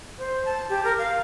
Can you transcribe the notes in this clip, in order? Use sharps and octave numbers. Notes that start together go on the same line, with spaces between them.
C5
A5
G4
A#4
F5